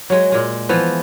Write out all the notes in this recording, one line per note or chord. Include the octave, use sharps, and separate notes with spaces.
F#3 G#3
A#2 G#3
E3 F3 B3